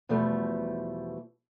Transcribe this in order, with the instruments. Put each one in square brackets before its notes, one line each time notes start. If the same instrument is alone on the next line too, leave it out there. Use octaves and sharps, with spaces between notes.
[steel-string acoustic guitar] E2 B2 F3 G3 A3